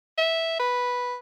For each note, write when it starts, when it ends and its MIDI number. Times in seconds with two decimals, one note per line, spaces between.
0.18 0.57 76
0.59 1.16 71